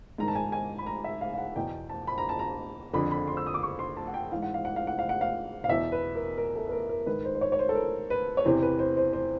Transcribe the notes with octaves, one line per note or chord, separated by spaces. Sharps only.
G#2 D#3 A#5
A5
G#5
G#5
B5
A#5
E5
F5
F5
F#5
E2 B2 G5
A5
B5
A#5
A5
A#5
F2 D3 B5
B5
C6
E6
D#6
D6
C#6
C6
A5
F#5
G5
G#2 E3 F5
F#5
F5
F#5
F5
F#5
F5
F#5
F5
F5
E2 B2 E5
B4
A#4
A#4
A4
B4
A#4
A#4
G#2 D#3 B4
C5
C5
C#5
C#5
C5
A4
A#4
B4
C#5
E2 C3 E3 C5
B4
C5
C5
C5